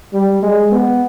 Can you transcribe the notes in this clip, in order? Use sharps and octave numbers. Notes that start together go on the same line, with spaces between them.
G3
G#3
B3